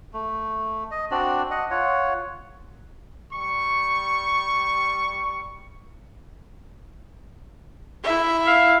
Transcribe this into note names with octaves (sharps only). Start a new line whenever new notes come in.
A3
D#5
C4 D4 F#4 D5
D#5 F#5
F4 C#5 F#5
G3 C#6
E4 E5
F5